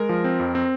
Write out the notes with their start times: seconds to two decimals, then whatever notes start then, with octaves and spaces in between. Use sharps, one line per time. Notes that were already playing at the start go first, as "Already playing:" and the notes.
Already playing: G#3 A#4
0.09 F3
0.24 C4
0.40 F2
0.55 C4